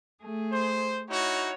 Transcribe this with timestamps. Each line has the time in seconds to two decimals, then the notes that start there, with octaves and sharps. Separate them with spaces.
0.22 A3 G#4
0.52 C5
1.09 D#4 E4 F#4 C#5